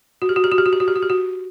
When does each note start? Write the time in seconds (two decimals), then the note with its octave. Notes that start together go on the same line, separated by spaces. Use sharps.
0.22 F#4
0.29 G4
0.36 F#4
0.44 G4
0.52 F#4
0.58 G4
0.66 F#4
0.73 G4
0.80 F#4
0.88 G4
0.96 F#4
1.02 G4
1.10 F#4